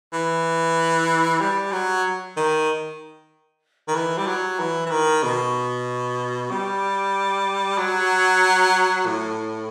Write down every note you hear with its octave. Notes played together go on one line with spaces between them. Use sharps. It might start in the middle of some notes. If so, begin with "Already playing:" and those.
E3
G3
F#3
D#3
D#3
E3
G3
F#3
E3
E3
D#3
B2
G3
F#3
A2